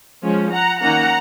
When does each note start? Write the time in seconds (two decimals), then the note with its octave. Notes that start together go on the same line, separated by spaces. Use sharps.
0.22 F3 G#3 C#4
0.51 F#5 A#5
0.81 D#3 A#3 C#4 F#5 A#5